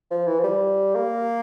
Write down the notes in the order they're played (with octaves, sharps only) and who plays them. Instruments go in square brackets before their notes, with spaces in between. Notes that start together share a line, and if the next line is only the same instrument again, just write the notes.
[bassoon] F3
E3
F3
G3
A#3